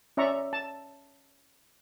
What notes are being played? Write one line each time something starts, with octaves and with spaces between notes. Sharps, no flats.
C#4 D5 E5 A#5 C#6
A5